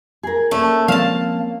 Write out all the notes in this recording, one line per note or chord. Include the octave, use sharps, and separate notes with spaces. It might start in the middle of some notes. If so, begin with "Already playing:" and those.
G#4 A#4
A3 A#3 C#4
F3 G#3 C4 F5 A5